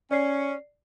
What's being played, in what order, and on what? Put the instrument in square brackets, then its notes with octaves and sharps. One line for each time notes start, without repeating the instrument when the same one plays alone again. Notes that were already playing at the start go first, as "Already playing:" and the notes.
[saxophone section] C#4 [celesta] D5 C7